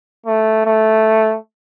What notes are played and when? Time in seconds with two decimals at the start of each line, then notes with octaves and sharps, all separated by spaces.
0.26 A3
0.66 A3